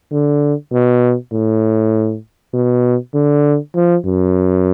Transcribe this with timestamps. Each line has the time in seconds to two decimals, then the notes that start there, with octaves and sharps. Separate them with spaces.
0.12 D3
0.72 B2
1.33 A2
2.54 B2
3.14 D3
3.75 F3
4.05 F#2